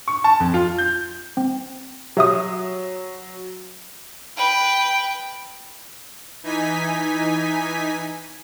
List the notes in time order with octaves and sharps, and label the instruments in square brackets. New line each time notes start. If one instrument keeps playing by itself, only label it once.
[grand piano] C#6
A5
F2
F4
G6
[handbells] C4
[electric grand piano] F#3 [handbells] G4 E5 D#6
[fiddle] B4 G5
[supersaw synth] E3 D#4 G#5 B6